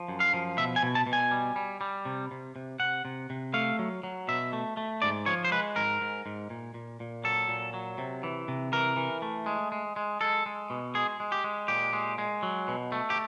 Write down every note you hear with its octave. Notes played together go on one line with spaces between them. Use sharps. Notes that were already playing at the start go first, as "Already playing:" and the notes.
Already playing: F3
F#2
F5
F3
B2 E5
G#5
B2
A5
B2
G#5
G3
G3
G3
C3
C3
C3
C3 F#5
C3
C3
A3 F5
F#3
F#3
B2 E5
A3
A3
G#2 D5
F3 C#5
C5
G#3 B4
G#2 A#4
G#2
G#2
A#2
A#2
A#2
F#3 A4
A#2
F#3
C3
E3
C3
E3 A#4
E3
A3
G#3
G#3
G#3
G#3 A4
G#3
B2
G#3 G#4
G#3
G4
G#3
A#2 G4
G#3
G#3
F#3
B2
A3
G4